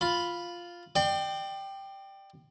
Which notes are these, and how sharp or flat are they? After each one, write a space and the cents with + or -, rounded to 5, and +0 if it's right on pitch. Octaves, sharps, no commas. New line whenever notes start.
F4 +0 B5 +0
D5 +35 G5 +0 C6 +0